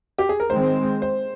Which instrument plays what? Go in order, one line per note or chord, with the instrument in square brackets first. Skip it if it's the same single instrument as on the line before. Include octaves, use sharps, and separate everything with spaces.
[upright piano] G4
G#4
A#4
[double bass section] D#3 G#3 C4 [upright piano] C5
[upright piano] C5